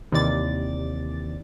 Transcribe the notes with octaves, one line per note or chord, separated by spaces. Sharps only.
D#2 C3 E3 D5 A6